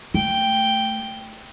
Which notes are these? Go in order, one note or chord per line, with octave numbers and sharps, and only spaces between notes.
A3 G5